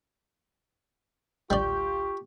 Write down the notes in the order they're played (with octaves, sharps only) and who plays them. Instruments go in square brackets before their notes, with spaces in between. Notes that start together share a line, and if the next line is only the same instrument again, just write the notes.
[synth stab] A1 D2 G6 [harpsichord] G3 D5 [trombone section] F4 G4 [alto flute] C#6